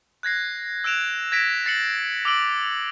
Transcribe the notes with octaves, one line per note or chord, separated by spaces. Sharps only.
F#6 G#6 A#6 C7
E6 F#6 D7 E7 F7
G#6 A#6 B6 D7 E7
A6 C7 C#7 F#7
D6 E6 D7 F#7